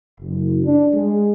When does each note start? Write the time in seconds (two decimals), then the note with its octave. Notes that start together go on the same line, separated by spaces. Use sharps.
0.21 F#1
0.65 D4
0.94 G#3